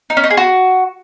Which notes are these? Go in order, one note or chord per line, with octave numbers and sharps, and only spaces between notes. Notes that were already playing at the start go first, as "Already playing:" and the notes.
D#4
C#4
D#4
G#4
F#4